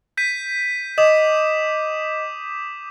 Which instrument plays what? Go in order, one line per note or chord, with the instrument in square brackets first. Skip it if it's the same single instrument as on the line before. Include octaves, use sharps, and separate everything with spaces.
[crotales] G6 B6 D#7
[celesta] D#5 [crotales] D6 D#6 E7